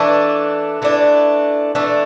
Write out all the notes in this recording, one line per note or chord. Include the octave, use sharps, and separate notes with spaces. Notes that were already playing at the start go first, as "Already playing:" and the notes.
Already playing: E3 A3 D4
E3 A3 D4
E3 A3 D4